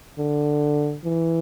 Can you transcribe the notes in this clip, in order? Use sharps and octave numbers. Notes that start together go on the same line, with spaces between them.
D3
E3